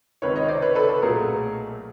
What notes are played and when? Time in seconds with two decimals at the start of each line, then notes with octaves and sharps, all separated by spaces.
0.22 C#2 C3 D#3 B4 C#5
0.36 C#5 D#5
0.48 C5 D5
0.62 B4 C#5
0.75 A4 B4
0.88 A4 B4
1.02 B1 A#2 F#3 A3 G#4 A#4